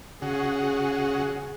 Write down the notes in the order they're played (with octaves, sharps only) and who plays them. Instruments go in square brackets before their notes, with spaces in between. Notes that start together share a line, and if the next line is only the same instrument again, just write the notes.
[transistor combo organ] C#3 F#4 [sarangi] G#4